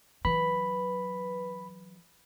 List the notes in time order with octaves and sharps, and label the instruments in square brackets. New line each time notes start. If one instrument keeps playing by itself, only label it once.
[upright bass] E3 F#3 [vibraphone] B4 [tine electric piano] B5